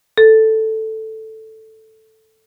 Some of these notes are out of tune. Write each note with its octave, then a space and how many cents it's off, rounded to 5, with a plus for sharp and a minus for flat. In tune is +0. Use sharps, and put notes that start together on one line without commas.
A4 +0